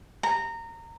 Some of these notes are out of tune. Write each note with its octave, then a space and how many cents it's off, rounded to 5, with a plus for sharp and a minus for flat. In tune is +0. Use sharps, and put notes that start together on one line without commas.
A#5 -20